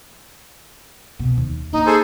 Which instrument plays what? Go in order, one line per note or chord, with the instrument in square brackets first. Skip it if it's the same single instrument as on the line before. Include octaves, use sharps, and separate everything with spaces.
[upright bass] B2
D#2
[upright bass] A#3 [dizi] D#4
[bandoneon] G#4 A4 C5